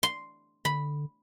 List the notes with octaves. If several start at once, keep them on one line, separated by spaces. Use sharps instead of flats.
C6
D3 B5